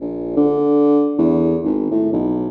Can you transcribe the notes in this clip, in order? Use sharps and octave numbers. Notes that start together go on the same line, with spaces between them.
A#1
D3
E2
G#1
A2
B1